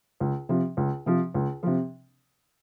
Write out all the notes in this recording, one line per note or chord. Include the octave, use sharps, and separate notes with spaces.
C#2
C3 F3
C#2
C3 F3
C#2
C3 F3